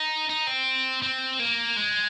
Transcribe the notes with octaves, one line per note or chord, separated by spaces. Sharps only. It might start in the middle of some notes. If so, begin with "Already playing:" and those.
Already playing: D#4
D#4
C4
C4
A#3
G#3